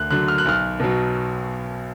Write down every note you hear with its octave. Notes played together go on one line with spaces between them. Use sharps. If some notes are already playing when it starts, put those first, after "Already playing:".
Already playing: D2 F#6
D3 F#3 F#6
F6
F#6
B1 F6
B2 F#3